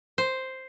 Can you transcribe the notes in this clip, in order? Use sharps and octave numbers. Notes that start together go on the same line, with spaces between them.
C5